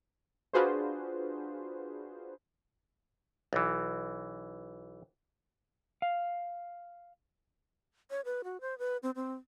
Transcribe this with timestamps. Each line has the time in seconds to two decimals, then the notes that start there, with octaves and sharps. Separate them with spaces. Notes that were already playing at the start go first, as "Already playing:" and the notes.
0.53 D4 F4 F#4 G#4 B4 C5
3.53 B1 E3
6.02 F5
8.10 C#5
8.25 B4
8.44 F#4
8.61 C5
8.79 B4
9.03 C4
9.16 C4